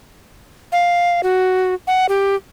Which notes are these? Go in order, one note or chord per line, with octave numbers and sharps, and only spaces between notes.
F5
F#4
F#5
G4